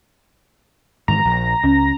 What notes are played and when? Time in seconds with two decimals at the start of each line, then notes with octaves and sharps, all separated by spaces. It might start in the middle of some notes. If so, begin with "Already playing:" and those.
1.08 G#2 D#3 E3 A#5
1.25 A#1
1.63 C#2 C#4